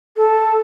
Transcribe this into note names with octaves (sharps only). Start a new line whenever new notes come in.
A4